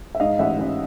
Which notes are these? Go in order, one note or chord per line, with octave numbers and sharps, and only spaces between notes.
E5
G#2 D#5 F5
A1 E5 F#5
A1